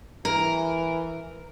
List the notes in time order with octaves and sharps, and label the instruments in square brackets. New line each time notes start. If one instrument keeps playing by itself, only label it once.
[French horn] E3 [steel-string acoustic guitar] A#4